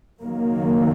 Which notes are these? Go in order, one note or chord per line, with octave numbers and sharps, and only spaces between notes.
F#1 F#2 D#3 F#3 A#3